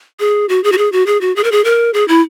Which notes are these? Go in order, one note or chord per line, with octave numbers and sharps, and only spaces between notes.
G#4
F#4
G#4
F#4
G#4
F#4
G#4
F#4
G#4
A#4
G#4
A#4
G#4
E4